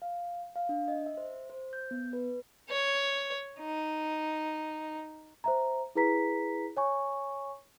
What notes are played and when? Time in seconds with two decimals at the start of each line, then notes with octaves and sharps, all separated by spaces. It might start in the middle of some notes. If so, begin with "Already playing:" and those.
0.02 F5
0.56 F5
0.69 D4
0.88 D#5
1.06 E5
1.17 C5
1.50 C5
1.73 G6
1.91 B3
2.13 B4
2.70 C#5
3.60 D#4
5.44 C5 E5 A#5
5.95 E4 G#4 B4 A#5 B6
6.77 C#5 G#5 C#6